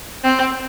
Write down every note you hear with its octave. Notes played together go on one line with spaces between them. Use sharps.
C4